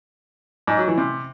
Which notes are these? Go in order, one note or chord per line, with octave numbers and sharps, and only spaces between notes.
G#2
F#3
E3
C3